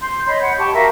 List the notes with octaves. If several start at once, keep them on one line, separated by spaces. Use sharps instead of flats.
C6 G6
C#5 D#5 B5 C6
F#5 G6
G4 A5 C#6
F#4 A#4 E5 F5